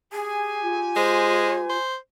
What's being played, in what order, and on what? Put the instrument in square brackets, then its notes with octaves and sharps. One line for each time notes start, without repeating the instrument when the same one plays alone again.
[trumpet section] G4 G#5 [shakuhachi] G#4
[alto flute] F4
[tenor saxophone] G#3 [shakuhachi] C5
[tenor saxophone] C5